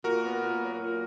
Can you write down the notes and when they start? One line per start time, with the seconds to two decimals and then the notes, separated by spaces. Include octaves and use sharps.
0.04 A#2 F#4 A#4
0.24 B3
0.43 A#2
0.61 F#3
0.80 A#2